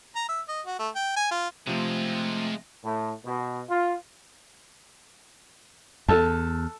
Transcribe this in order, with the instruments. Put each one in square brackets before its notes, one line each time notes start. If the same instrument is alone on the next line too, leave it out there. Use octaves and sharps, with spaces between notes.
[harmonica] A#5
E5
D#5
F#4
A3
G5
G#5
F4
[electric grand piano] C3 F3 C4 [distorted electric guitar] G#3 F4 [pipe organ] A3
[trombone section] A2
B2
F4
[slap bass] E2 [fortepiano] A4 A5